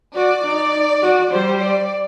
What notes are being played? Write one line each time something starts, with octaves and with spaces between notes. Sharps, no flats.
F#4 D5
D#4
F#4
G3 C5
D5